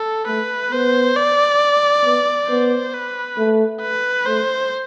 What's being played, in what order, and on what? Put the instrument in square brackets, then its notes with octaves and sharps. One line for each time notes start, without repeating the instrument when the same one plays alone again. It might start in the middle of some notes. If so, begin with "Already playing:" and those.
Already playing: [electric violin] A4
[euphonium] A3 [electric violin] B4
[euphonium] B3 [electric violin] C5
[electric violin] D5
[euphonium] B3
[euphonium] B3 [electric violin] C5
[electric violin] B4
[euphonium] A3
[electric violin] B4
[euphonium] A3 [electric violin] C5